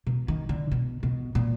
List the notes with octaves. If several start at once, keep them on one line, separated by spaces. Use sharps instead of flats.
B2
D#3
D3
B2
B2
A#2